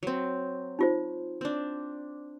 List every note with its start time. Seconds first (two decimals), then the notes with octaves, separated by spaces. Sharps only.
0.03 F#3 C4
0.79 D#4 F4 C5
1.41 C4 D4